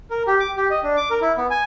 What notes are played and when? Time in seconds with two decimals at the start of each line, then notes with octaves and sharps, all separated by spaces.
0.10 A#4
0.27 G4
0.40 D6
0.57 G4
0.70 D#5
0.83 D4
0.97 D6
1.10 A#4
1.22 E4
1.37 B3
1.50 G#5